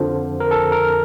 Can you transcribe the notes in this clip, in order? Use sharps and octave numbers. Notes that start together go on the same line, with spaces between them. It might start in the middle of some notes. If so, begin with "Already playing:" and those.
Already playing: F2 D3 F3 C5
A#4
A4
A#4